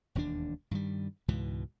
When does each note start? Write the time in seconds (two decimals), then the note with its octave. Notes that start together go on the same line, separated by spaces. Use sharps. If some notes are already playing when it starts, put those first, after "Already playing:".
0.15 E1 D#2 C4 D4
0.71 G2 D#3 G3
1.28 C#2 G#2 B2 E3